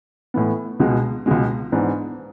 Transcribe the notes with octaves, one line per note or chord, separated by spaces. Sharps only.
A2 E3 B3
C#2 B2 G#3
C#2 B2 G#3
G#2 E3 B3 D4